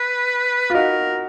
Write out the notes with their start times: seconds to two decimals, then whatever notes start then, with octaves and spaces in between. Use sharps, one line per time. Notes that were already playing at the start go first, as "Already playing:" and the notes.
Already playing: B4
0.70 F4
0.74 D#4 F#4 A#4